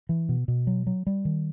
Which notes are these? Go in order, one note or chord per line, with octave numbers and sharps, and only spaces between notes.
E3
B2
B2
F#3
F#3
G3
D#3